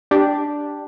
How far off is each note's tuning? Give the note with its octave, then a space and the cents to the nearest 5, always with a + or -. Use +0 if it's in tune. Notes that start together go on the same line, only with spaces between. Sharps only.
D4 +0 G4 +0